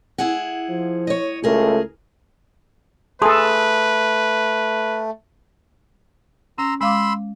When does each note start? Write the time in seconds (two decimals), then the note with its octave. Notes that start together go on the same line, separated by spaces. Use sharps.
0.18 E4 G#4 F#5
0.69 F3
1.07 C#5 D#5
1.44 C#2 A3 G#4 A#4
3.22 A3 G#4 A4 B4 A5 C6 D#6
6.58 C#4 A#5 C6 E6
6.81 G#3 F5 B5 C6 D6 E6